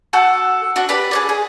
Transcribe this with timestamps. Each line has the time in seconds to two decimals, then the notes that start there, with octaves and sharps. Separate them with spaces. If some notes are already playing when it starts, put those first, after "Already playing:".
0.13 F#4 A4 F#5 G6
0.76 C4 D4 F#4
0.89 G4 B4 D5 B5
1.11 G#4 C#5 D5
1.29 G#4